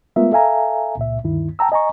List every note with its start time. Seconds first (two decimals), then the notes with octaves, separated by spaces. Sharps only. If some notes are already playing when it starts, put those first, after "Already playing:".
0.16 G#3 A3 B3 F4 A#4 E5
0.32 A4 E5 F5 G#5 A#5
0.97 C#2 A#2 E5
1.24 D2 G2 D#3 E4
1.59 G5 A5 A#5 E6
1.72 D#5 G#5 A#5 C#6